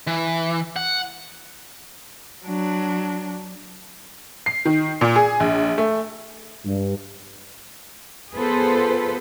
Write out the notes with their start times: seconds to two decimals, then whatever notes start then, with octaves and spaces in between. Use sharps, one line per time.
0.07 E3
0.76 F#5
2.44 F#3 D4
4.46 C7
4.65 D#3
5.01 A#2
5.16 G#4
5.40 A#1
5.78 A3
6.65 G2
8.35 B3 F4 G#4 A4 B4 C5